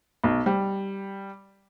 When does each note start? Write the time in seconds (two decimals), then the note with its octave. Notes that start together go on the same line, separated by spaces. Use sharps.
0.24 B1
0.46 G3